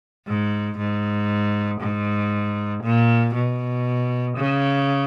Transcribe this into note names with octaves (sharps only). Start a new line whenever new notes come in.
G#2
G#2
G#2
A#2
B2
C#3